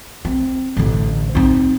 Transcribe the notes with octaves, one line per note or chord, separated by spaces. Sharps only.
C4
A1 D3
C4 D#4